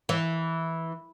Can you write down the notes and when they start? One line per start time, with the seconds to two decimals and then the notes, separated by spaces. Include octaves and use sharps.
0.09 E3